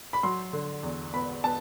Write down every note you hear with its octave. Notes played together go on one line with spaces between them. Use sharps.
B5
F#3 C6
D3
E2
B3 B5
B3 A5